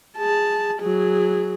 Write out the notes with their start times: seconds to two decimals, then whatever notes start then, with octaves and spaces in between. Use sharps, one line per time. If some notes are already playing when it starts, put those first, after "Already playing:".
0.18 G#4 A5
0.79 F#3 G#4